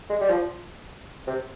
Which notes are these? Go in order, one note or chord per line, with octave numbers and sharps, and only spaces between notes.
G#3
G3
F3
C3